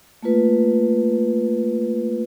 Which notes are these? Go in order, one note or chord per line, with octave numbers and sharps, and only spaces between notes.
A3 A#3 F4 B4